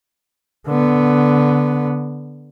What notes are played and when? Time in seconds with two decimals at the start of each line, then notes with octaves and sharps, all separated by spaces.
0.67 D3 B3